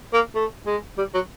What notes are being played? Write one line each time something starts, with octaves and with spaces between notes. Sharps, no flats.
A#3
A3
G#3
G3
F#3